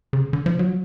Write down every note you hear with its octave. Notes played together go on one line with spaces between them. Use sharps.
C#3
D3
F3
F#3